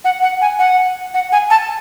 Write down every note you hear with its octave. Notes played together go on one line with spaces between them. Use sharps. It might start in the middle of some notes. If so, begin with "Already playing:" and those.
F#5
F#5
G#5
F#5
F#5
G#5
A5